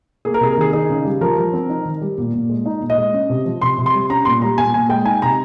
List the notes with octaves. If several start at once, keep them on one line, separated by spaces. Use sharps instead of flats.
A#3 G#4
A#4
C3 G#4
A#4
D#3 G#4
D#4 G#4
C#3
G3
F3 A#4
F3
C4
D#4
D#3
G3
A#2
A#2
G#3
D#4
A#2
D#5
G#3
C#4
C3
F3
C3 C6
C3
C6
G3
C#4 A#5
A#2 C6
G3 A#5
A#2 G#5
A#2 G#5
G#3 G5
D#4 G#5
C3 A#5